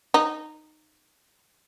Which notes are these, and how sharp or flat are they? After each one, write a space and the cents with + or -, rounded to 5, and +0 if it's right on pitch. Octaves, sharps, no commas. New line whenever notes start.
D#4 -15